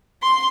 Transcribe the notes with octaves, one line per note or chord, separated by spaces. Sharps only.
C6